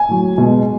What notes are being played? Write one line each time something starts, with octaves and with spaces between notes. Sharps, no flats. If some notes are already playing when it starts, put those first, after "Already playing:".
Already playing: G#5
A2 F#3
B2 G#3